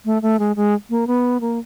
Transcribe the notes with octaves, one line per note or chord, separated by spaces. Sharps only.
A3
A3
G#3
G#3
A#3
B3
A#3